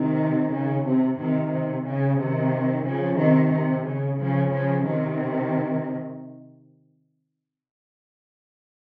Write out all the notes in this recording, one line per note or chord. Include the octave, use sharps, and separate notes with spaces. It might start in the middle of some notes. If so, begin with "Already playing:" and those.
Already playing: C3 D#3
C#3
C3
C3 D#3
C3
C#3
C3 D#3
C#3 F3
C3 D#3
C3
C#3
C#3 F3
C#3 F3
C3 D#3